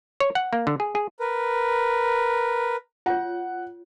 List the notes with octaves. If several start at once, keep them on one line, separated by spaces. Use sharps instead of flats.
C#5
F#5
A#3
D3
G#4
G#4
A#4 B4
F4 C#5 F#5